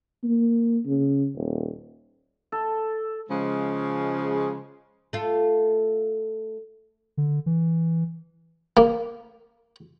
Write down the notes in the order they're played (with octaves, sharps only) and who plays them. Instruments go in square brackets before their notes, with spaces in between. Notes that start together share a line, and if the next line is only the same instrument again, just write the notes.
[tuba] A#3
C#3
D#1
[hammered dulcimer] A4
[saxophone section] C#3 F3 G#3
[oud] A3 F4
[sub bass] D3
E3
[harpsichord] A#3